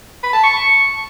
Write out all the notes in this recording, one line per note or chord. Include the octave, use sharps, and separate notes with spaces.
B5
A5
C#6